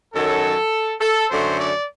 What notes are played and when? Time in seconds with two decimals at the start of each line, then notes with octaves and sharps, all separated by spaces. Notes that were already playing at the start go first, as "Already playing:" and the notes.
0.14 F#2 D#3 F#3 A4
1.01 A4
1.30 F#2 D3 A3 C5
1.59 D5